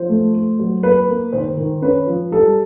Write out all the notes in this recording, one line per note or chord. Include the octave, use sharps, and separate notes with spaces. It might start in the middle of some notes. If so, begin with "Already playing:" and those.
Already playing: F3 C5
A3
A3
F#3
A#3 B4
A#3
D#3 C5
D#3
C#4 B4
F3
G3 A4